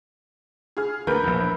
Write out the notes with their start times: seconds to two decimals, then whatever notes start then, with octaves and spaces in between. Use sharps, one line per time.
0.77 G#4 F6
1.07 D2 A#4 B4 G6
1.23 A#1 E2